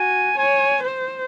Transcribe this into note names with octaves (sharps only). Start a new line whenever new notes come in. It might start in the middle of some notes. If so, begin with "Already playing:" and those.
Already playing: F#4 G#5
C#5 G#5
C5